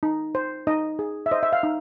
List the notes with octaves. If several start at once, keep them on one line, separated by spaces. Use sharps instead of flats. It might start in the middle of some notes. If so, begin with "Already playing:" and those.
D#4
C5
D#4 D#5
G#4
E5
C5 D#5
E5
F5
D#4